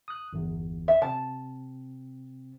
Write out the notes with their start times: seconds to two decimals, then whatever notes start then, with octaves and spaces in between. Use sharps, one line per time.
0.08 D#6 F#6
0.33 G1 E2
0.88 E5
1.02 C3 C4 A5